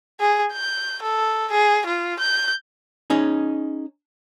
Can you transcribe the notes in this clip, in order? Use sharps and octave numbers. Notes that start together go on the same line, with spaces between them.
G#4
G6
A4
G#4
F4
G6
C#4 D#4 G#4